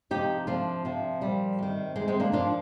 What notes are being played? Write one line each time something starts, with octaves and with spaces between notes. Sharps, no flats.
C3 F3 D#4 G4
C3 F3 D4 F4
C3 F3
A#2 F3 G3
C3 D#3
C3 D#3 G#3
G#3 C4
A#3 D4
A#2 F3 D4 F4